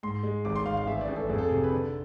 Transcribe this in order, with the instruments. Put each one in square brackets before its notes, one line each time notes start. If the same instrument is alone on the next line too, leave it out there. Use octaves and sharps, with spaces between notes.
[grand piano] G#2 C6
G#3
G#1 D6
C6
G#1 F5
F5
A1 E5
D5
A1
A4
F2 G#4
A4
C3 G#4
B4
D3 A4